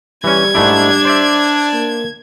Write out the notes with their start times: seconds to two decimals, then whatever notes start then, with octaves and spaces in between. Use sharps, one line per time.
0.24 E3 G3 C#4 G#6
0.55 G#2 A3 D4 E4
1.05 C5 D5 E5
1.73 A#3